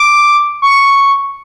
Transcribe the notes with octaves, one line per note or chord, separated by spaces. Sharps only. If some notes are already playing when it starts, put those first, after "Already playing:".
Already playing: D6
C#6